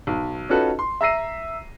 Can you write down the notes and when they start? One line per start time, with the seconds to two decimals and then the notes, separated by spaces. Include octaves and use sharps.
0.07 B1
0.49 C#4 D#4 F4 F#4 A4 B4
0.79 C6
1.01 E5 A#5 E6 A#6 C7 D#7